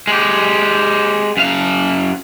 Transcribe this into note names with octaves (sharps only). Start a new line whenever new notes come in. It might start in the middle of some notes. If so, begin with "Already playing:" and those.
G#3 G4
F#2 F5